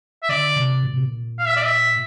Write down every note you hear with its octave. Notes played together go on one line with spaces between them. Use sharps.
E5
D3 D5
C3
A#2
C3
A#2
F5
E5
D5
E5